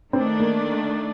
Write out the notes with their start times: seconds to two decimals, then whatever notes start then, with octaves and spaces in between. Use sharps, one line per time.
0.13 D#3 A3 C4 D4
0.40 A#3